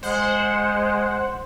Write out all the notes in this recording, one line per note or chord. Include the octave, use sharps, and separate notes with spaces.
G#3 C5 F#5